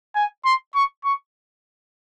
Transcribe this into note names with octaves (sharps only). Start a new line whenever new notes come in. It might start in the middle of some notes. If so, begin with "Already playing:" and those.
G#5
C6
C#6
C#6